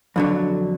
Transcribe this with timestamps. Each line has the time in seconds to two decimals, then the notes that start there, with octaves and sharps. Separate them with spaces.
0.16 F2 D3 F#3